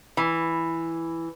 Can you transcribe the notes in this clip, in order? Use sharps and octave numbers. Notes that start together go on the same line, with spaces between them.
E3